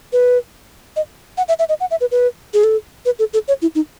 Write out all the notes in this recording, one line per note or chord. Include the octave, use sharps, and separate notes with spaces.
B4
D#5
F#5
E5
E5
D#5
F#5
E5
B4
B4
G#4
A4
B4
A4
A4
C#5
E4
D#4